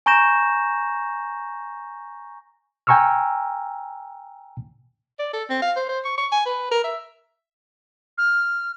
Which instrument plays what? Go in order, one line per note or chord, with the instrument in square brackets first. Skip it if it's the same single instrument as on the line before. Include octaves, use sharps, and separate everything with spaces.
[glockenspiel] G#5 A#5 C#6 G6 A#6 E7
[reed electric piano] G5 G#5 A#5 C#6 E6 F6
[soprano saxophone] D5
A4
C4
F5
C5
C5
C#6
C#6
G#5
B4
A#4
E5
[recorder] F6